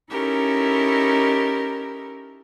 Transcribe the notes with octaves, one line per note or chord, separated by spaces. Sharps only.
C#4 D#4 E4 G4 A4 A#4